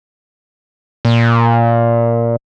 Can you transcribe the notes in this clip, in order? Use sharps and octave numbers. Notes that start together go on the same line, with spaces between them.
A#2